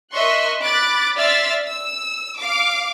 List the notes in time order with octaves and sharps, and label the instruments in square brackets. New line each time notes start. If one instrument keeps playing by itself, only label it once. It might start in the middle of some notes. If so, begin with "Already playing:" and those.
[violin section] A#4 D#5 E5 C6 C#6 F#6
B5 D6 F#6 A6
D5 E5 C6 E6 F6 A6
E6
F5 D6